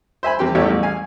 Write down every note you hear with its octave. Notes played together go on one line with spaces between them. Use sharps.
C5 E5 G#5 B5
E2 C4 G4 G5 C6
A1 E2 A3 E4 G4 C#5
A1
F5 G#5